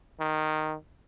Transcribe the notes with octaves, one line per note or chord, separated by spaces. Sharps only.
D#3